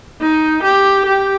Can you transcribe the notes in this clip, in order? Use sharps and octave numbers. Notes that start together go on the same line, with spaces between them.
D#4
G4
G4